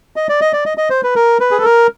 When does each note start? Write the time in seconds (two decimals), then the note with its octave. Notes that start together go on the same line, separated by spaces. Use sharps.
0.16 D#5
0.29 D5
0.41 D#5
0.53 D5
0.66 D#5
0.78 D#5
0.90 C5
1.03 B4
1.15 A#4
1.40 B4
1.51 G#4
1.58 A4
1.65 A#4